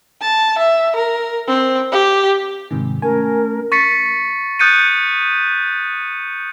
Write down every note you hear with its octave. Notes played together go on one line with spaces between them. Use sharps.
A5
E5
A#4
C4
G4
G#2 C3 D#3 G#3
A3 C#4 A#4 G#5
C#6 A6 B6 C#7
D#6 F#6 G6 A6 C#7 D#7